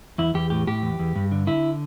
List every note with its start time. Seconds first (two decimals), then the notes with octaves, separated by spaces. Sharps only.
0.18 E2 E4
0.34 E2 G4
0.50 A2 G4
0.67 A2 G4
0.82 E2
0.99 E2
1.15 G2
1.32 D3
1.47 D3 E4